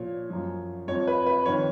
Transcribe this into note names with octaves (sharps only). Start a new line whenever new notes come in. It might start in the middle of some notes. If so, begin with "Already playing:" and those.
Already playing: A#2 F3 C#5
F#2 F3
F2 F3 C#5
B4
B4
F2 D#3 C#5